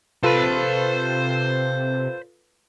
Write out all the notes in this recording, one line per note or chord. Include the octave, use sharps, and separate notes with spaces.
C3 F4 A4 B4 C5 B5